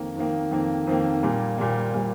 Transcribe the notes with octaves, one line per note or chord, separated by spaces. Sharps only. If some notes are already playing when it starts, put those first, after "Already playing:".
Already playing: F2 D#3 A#3
F2 D#3 A#3
F2 D#3 A#3
F2 D#3 A#3
A#2 G3 A#3
A#2 G3 A#3
A#2 G3 A#3